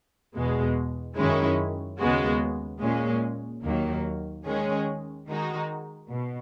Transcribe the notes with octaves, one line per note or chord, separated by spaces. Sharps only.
E2 B2 G#3
F#2 D#3 G#3 C#4 E4
D#2 C#3 G#3 B3 F#4
A#2 G#3 C#4
D#2 D#3 F#3 A#3
D#3 G#3 C#4 G#4
D#3 G#3 D#4 F#4
B2